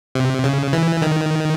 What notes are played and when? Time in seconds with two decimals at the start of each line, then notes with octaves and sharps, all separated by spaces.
0.15 C3
0.44 C#3
0.73 E3
1.02 D#3